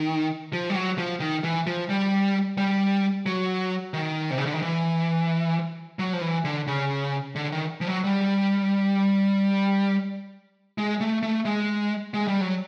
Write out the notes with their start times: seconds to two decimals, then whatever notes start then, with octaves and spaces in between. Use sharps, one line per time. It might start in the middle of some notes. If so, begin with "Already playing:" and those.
Already playing: D#3
0.53 F3
0.70 G3
0.75 F#3
0.98 F3
1.20 D#3
1.44 E3
1.67 F3
1.90 G3
2.58 G3
3.26 F#3
3.93 D#3
4.31 C3
4.38 C#3
4.46 D3
4.54 D#3
4.62 E3
5.99 F#3
6.13 F3
6.21 E3
6.45 D3
6.67 C#3
7.35 D3
7.52 D#3
7.81 F3
7.88 F#3
8.04 G3
10.78 G#3
11.01 A3
11.23 A3
11.45 G#3
12.14 G#3
12.27 G3
12.41 F#3